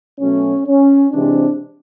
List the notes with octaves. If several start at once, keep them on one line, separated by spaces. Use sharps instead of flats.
B2 F#3 A3 C#4
C#4
C3 E3 G#3 C4 D4